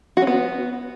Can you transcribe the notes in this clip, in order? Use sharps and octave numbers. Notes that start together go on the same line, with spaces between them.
F#4
C#4
B3